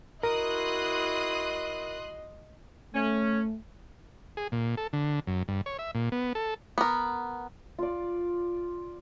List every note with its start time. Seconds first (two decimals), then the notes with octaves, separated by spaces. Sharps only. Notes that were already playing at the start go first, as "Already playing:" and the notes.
0.23 E4 F#4 A#4 D#5 C6 D#6 F#6
2.94 A3 C#4
4.37 G#4
4.52 A#2
4.77 A4
4.93 D3
5.27 F#2
5.48 G2
5.66 C#5
5.79 E5
5.95 A#2
6.12 B3
6.35 A4
6.78 B3 A#4
7.79 F4 D5